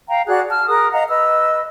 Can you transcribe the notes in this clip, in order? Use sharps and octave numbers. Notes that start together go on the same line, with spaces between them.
F5 G5 A#5
F#4 G#4 D5 F#6
A5 F6
G#4 A#4 D#6 F#6
D#5 F5 F#5 A#5
B4 D#5 E6